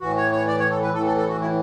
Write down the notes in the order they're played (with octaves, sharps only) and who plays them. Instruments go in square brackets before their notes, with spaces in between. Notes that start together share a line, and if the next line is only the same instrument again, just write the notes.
[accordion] A2 E3 F#4
C#5
C#5
D5
C#5
A4
B4
A2 E3 A4
A4
A4
F#4
E4